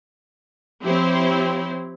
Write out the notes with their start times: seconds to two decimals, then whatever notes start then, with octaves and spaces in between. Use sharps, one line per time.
0.83 F3 C4 E4 G4 C5 C#5